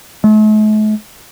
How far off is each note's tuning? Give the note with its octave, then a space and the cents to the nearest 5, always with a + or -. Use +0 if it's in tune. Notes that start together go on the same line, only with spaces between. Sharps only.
A3 -45